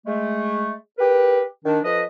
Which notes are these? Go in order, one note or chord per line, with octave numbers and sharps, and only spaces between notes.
G#3 A3
G4 A#4 B4
D#3 D4
F2 F3 B4 D#5